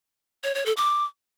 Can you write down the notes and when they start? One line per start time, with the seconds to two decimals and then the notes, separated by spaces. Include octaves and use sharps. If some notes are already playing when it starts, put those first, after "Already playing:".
0.44 C#5
0.55 C#5
0.66 A4
0.77 D6